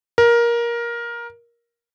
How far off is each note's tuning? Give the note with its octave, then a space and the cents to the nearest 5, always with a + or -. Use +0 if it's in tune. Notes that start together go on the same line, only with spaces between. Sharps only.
A#4 +15